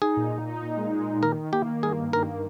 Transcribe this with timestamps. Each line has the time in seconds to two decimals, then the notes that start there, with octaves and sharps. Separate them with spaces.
0.02 D#4 G#4
0.17 A#2
0.32 A#2
0.47 D#4
0.62 A#2
0.77 G#3
0.93 G#3
1.07 A#2
1.23 D#3 A#4
1.37 D#3
1.52 A#3 G4
1.68 A#3
1.83 G2 G#4
1.98 G2
2.13 A#3 A#4